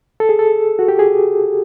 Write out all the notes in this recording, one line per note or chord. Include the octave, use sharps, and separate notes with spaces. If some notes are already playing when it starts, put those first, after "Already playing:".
A4
G#4
A4
F#4
G4
G#4